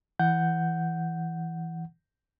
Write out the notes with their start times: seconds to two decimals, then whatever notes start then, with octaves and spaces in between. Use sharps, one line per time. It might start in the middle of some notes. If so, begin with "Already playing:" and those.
0.19 E3 F#5 G6